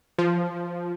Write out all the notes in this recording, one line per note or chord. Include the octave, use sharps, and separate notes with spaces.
F3